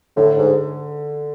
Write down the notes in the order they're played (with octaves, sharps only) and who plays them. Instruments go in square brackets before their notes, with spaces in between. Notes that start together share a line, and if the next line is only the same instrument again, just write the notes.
[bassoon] A2 [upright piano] D3
[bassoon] G#2